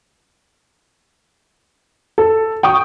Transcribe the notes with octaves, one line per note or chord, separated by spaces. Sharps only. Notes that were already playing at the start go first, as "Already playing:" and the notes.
A4
G5 C#6 D#6